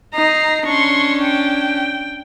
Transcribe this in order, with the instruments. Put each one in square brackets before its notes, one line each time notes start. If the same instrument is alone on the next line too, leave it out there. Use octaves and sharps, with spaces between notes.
[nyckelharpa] D#4 [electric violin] A#5 C7
[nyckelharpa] C#4 D4 [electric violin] C6 C#6
[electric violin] G5